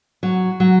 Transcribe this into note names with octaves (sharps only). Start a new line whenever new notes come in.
F#3
F#3